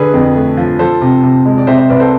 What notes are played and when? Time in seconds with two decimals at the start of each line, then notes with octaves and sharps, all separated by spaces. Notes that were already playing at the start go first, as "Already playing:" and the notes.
Already playing: D3 G#4 B4
0.14 F2
0.35 A3
0.57 F3
0.79 F3 A4 C5
1.01 C3
1.23 C3
1.45 G#3
1.58 D5
1.67 C3 C5 E5
1.78 C5 E5
1.89 C2 B4 D5
2.00 A4 C5